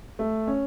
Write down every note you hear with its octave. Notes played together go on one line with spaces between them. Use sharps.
A3
C#4